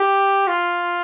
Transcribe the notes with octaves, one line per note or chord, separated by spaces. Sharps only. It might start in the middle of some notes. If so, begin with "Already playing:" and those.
Already playing: G4
F4